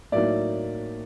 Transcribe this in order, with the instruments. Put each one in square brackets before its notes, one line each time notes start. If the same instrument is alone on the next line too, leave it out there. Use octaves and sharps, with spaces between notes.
[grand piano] A2 F#3 A#3 D#4 D5 E5